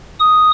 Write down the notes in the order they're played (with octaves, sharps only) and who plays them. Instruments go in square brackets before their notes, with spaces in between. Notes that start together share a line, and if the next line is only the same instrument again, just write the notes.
[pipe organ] D#6